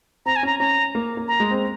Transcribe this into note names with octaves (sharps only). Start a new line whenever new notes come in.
C4 A#5
G#5
C#4
A#5
C#4 A#5
A#3
A#3
A#5
G#3
C4